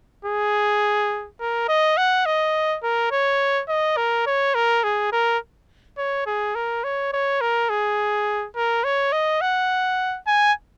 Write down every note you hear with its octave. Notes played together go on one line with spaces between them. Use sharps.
G#4
A#4
D#5
F#5
D#5
A#4
C#5
D#5
A#4
C#5
A#4
G#4
A#4
C#5
G#4
A#4
C#5
C#5
A#4
G#4
A#4
C#5
D#5
F#5
G#5